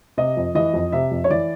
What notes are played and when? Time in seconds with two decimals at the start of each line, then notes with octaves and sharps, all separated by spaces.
0.18 C3 D#5
0.37 F2
0.55 E3 D#5
0.74 F2
0.92 C3 E5
1.11 F2
1.24 C#5
1.30 E3 D5